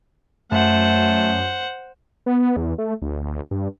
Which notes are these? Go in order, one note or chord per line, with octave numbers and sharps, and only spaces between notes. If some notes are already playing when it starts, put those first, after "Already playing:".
F#2 A3 C5 F#5
B3
E2
A3
D2
G2